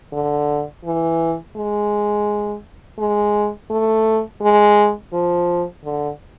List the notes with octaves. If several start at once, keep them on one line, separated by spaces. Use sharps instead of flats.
D3
E3
G#3
G#3
A3
G#3
F3
D3